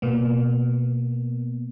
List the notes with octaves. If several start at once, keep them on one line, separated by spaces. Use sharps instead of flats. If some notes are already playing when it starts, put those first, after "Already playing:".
B2 A#3 B3